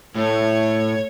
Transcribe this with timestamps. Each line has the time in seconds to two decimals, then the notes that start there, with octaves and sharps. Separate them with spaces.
0.15 A2 A3 C#5